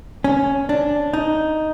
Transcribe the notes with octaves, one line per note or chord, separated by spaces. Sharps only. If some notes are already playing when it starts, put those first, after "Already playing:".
C#4
D4
D#4